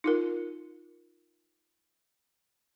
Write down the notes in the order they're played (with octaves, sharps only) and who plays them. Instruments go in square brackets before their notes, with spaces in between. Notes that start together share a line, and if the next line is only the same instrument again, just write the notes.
[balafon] D#4 F4 A#4